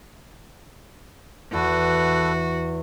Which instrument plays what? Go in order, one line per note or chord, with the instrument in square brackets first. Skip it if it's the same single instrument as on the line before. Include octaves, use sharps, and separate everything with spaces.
[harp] E2 [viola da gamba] F#4 [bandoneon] A4 B4